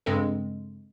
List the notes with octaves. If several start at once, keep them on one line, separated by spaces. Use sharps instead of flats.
G2 C#3 G#3 C4 A4